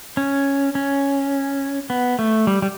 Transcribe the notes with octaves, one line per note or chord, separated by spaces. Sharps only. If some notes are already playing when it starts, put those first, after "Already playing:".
C#4
C#4
B3
A3
G3
G3